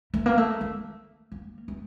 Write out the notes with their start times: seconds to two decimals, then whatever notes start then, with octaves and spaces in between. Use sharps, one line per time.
0.14 A3
0.26 A#3
0.38 A3
0.61 A3
1.32 A#3
1.68 A3